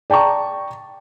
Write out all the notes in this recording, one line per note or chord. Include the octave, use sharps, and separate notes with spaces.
D5 G5 A5 A#5 C#6